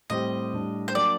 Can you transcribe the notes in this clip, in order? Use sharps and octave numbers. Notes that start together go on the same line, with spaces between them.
A2 G3 C4 G4 C5 D#5
A2 G3 D4
C5
F#3 A#3 D4 D5